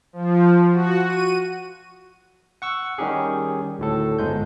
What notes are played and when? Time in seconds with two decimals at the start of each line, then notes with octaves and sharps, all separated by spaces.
0.13 F3
0.73 F#4
1.07 D#7
2.62 F#5 C#6 E6
2.98 D#3 G3 C#4 D#4 G4 G#4
3.79 D2 A2 A4
4.19 G1 G#2 G#3 G6